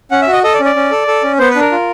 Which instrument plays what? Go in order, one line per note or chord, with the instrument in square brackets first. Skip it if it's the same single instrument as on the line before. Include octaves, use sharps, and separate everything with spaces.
[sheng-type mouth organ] C#4 F#5
E5
F#4
D#5
A4 D#5
D5
C#4
D5
C#4
A4
A4
C#4
B3 C5
B4
D4
A#4
F4